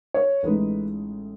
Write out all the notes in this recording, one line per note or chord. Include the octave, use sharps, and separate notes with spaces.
C#5
A1 A2 G#3 D#4 B4